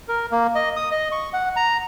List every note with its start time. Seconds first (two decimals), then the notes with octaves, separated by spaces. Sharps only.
0.08 A#4
0.31 A#3
0.55 D#5
0.76 D#6
0.91 D#5
1.12 C#6
1.33 F#5
1.56 A#5